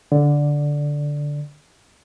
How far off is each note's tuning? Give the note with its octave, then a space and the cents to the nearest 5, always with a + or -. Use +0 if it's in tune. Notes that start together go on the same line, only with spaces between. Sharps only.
D3 -10 D5 +0